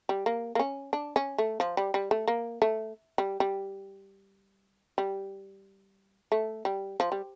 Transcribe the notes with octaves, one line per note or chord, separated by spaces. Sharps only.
G3
A#3
A#3
C#4
D4
C#4
A3
F3
G3
G3
A3
A#3
A3
G3
G3
G3
A3
G3
F3
G3